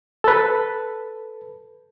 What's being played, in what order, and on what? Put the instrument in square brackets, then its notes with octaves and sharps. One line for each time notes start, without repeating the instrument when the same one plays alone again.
[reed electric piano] A4 B4